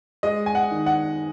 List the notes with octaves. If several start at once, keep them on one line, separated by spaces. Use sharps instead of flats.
G#3 D#5
G#5
F#5
D#3
F#5